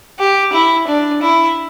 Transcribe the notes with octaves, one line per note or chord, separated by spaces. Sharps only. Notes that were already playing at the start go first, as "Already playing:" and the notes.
G4
E4
D4
E4